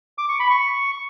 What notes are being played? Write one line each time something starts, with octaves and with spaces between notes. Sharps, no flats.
D6
C#6
B5
C#6